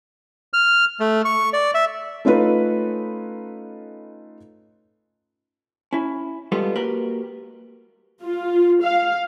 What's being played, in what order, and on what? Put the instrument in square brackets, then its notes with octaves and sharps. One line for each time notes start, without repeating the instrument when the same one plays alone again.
[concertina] F6
A3
C#6
D5
E5
[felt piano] A3 C#4 D#4 F4 A4 B4
[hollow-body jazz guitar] C#4 E4
G3 G#3 B3 F4 G4 A4
A#3 F#4 G4 A#4 B4
[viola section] F4
F5